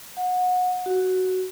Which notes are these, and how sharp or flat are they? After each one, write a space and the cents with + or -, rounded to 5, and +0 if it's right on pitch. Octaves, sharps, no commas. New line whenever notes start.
F#5 -25
F#4 +10